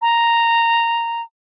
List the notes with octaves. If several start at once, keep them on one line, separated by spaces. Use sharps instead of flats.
A#5